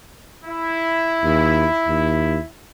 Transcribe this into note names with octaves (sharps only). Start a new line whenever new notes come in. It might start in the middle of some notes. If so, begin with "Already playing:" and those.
E4
D#2
D#2